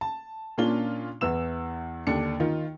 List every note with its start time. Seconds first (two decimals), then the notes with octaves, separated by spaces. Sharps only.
0.01 A5
0.58 A#2 A#3 C#4 D4 F4 G7
1.21 E2 E3 E6 E7
2.07 D#2 D3 D4 C#7
2.40 D#3 F4